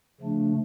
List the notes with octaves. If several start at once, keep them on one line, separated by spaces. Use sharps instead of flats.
C#3 F3 A3 D4